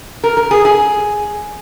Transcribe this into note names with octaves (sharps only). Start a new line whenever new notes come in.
A#4
A#4
G#4
G#4